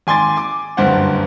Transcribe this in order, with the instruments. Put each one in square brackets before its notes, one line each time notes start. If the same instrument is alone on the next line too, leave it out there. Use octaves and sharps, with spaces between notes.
[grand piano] G#1 G#5 C6 D6 A6
D6
F#1 D2 G2 C5 F#5